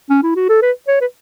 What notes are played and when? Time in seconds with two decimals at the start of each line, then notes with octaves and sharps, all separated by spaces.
0.10 C#4
0.23 E4
0.36 F#4
0.49 A4
0.62 B4
0.88 C#5
1.01 B4